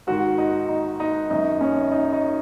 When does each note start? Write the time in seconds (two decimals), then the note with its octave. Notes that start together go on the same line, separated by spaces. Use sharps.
0.07 G#2 D#3 F#4
0.38 D#4
0.69 D#4
1.00 D#4
1.30 F#2 D#3 D#4
1.61 C#4
1.92 D#4
2.13 D#4